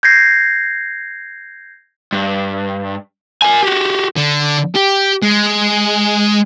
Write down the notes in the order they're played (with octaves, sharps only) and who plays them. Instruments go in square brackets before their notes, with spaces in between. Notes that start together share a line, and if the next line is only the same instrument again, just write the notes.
[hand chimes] G6 G#6 A#6 C7
[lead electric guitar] G2
A#4 G#5
F#4 G4
[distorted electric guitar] D3
G4
G#3